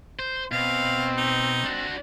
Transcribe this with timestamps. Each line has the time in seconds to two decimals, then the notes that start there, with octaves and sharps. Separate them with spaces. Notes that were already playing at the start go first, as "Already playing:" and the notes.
0.19 C5
0.52 B2 C4 F5
1.17 D#4
1.65 D4 F#4